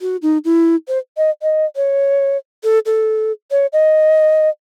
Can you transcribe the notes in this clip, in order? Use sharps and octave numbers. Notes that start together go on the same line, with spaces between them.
F#4
D#4
E4
C5
D#5
D#5
C#5
A4
A4
C#5
D#5